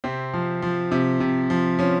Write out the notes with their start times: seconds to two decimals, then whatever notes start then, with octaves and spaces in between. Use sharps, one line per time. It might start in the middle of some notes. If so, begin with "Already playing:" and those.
0.04 C3 C4
0.34 F3
0.62 F3
0.92 C3
1.20 C3
1.50 F3
1.79 F3 C#4